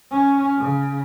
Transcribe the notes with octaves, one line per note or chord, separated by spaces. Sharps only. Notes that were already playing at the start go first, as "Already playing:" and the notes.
C#4
C#3